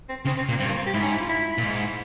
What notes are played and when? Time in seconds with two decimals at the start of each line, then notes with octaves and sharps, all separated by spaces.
0.09 C4
0.25 C#3 C4
0.37 C4
0.49 A#2 A#3
0.60 G2 C4
0.69 A#3
0.77 C4
0.86 G4
0.94 G#2 E4
1.03 C#4
1.11 E4
1.20 F4
1.29 E4
1.58 A#2
1.63 G#2